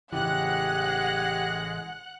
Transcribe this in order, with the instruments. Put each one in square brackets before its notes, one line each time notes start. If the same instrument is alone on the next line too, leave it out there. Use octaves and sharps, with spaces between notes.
[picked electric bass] A1 C#3 E3 [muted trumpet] G#3 [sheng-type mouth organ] G4 [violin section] F#5 F#6